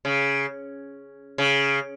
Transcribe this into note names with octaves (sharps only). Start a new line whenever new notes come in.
C#3
C#3